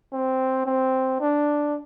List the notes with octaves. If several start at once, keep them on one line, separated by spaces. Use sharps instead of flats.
C4
C4
D4